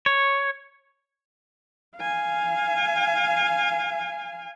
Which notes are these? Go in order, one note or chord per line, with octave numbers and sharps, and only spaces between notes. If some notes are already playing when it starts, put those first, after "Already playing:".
C#5
F5 G#5